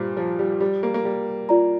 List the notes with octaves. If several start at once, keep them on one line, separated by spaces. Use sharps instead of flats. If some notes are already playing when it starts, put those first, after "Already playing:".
Already playing: G2 A#2 G4 C5 A#5 D6
F3
G3
G3
A#3
A#3
G3
F4 D5 A#5